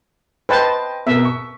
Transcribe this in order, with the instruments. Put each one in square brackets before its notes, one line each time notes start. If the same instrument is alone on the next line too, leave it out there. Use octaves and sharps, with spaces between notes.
[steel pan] B4 C5 A5 [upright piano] D#5 G5
[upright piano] B2 A#4 [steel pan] E5
[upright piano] C#6